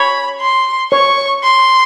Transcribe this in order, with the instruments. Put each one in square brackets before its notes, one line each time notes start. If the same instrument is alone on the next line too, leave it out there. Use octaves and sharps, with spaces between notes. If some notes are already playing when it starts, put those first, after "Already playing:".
Already playing: [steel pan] C#5 [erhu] B5
[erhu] C6
[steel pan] C#5 [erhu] C#6
[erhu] C6